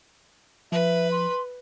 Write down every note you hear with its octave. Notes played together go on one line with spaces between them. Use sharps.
F3 B4 E5
C6